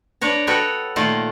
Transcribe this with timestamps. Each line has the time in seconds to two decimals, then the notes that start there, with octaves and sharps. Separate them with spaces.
0.21 D4 B4 C#5 A#5
0.47 F#4 A4 B4 C#5 D#5 G5
0.96 A#2 D#3 A3 F4 F#5